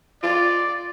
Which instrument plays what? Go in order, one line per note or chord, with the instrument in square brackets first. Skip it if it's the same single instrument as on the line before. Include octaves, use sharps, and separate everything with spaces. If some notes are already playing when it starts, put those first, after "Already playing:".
[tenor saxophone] F4 [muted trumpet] D5